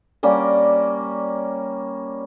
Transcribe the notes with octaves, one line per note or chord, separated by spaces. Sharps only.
G3 A#3 C#4 D5